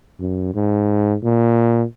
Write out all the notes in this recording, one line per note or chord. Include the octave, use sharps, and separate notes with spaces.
F#2
G#2
A#2